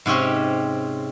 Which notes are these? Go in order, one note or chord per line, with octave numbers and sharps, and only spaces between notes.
G#2 C3 C4 C#4 G4